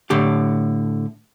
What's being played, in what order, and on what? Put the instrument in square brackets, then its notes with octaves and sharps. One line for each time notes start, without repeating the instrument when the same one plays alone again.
[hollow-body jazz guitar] A2 D3 G4